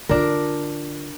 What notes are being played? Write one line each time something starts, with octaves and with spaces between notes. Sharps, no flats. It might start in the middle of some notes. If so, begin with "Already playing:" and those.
D3 D4 F4 A#4